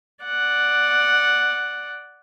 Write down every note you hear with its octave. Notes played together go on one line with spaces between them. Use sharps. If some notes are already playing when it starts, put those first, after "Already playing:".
D5 F#5